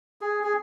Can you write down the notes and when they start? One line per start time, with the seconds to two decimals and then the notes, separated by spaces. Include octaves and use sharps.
0.21 G#4
0.43 G#4